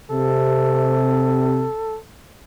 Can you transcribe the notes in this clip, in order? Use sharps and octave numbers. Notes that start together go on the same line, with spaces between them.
C3 A4